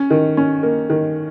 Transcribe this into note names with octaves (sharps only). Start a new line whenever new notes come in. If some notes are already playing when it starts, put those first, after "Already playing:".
Already playing: C#4
D#3
C#4
A#3
D#3